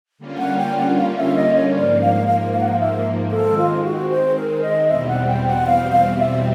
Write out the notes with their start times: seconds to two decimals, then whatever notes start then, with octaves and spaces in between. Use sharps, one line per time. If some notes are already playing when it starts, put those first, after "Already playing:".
0.18 D3 G3 A#3 C#4 F4
0.38 F#5
0.57 G5
0.77 F#5
0.96 F5
1.16 E5
1.36 D#5
1.55 C#5
1.75 G#2 F3 A#3 D5
2.01 F5
2.27 F5
2.53 F5
2.60 F#5
2.68 F5
2.79 E5
3.31 D#3 G#3 C4 A4
3.58 F4
3.84 F#4
4.10 C5
4.35 A#4
4.62 D#5
4.88 E2 B2 G3 C4 E5
5.07 F#5
5.27 G5
5.47 F#5
5.66 F5
5.92 F5
6.18 E5